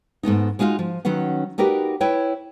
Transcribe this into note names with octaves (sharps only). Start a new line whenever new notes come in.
G#2 A3 B3 D#4
G#3 D#4 F4 F#4 F5
F3
D#3 F#3 C#4 B4 F#5
D#4 F#4 G4 A#4 B4 D5
E4 B4 C#5 G5